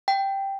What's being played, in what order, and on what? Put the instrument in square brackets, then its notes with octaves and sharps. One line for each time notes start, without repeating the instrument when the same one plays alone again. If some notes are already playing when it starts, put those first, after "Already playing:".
[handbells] G5